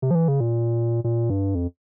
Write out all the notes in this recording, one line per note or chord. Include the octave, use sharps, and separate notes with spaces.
C3
F3
E3
C#3
A#2
A#2
G2
F2